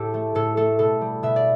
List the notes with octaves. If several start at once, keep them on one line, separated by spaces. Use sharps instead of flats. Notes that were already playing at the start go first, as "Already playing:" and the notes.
Already playing: A2 G4 A4
A3
A2 A4
A3 A4
B2 A4
G3
B2 E5
D5